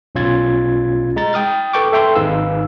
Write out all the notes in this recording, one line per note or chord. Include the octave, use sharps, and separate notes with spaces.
B1 B2 C#4 F4 G#6 A6
G#3 A#5 A6
G5 D#6 F6 A6
A4 B4 G5 C#6 D6
A4 E5 G5 C6
G#1 D#4 G#4 B4 F5 E6